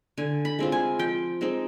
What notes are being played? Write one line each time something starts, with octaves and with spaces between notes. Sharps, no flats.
D3 G#5
B5
G#3 C4 F4
G#5
F3 G5
G#3 C4 D#4